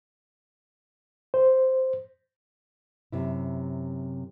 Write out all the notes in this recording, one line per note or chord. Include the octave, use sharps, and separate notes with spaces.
C5
F#2 C3 E4